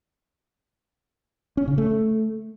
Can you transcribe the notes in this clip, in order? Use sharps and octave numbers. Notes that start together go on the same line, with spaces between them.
C#4
C#3
A3